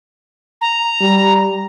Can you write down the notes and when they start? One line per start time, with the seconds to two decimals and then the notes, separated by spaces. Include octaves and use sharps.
0.61 A#5
1.00 G3